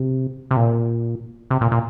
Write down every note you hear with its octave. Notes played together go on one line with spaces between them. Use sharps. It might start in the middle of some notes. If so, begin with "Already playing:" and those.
Already playing: C3
C3
A#2
C3
A#2
A#2